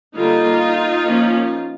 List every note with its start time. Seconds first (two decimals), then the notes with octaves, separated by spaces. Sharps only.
0.15 D3 G3 A#3 D#4 F4
1.04 F3 A#3 C#4